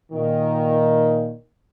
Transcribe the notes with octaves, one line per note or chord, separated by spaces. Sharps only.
A#2 D#3